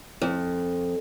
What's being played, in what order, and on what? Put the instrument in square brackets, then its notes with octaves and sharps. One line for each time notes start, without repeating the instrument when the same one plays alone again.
[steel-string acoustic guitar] F2